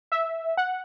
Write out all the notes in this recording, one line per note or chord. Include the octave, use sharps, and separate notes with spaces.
E5
F#5